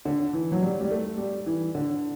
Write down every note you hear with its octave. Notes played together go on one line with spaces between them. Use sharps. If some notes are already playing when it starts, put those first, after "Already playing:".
D3
E3
F#3
G3
G3
A3
G3
E3
D3